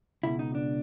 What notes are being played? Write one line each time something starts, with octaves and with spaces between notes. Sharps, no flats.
C#2 B2 E4
D#4
D4